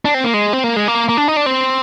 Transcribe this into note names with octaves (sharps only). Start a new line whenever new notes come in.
D4
C4
A#3
G#3
C4
A#3
G#3
A#3
A#3
D4
D#4
D4
C4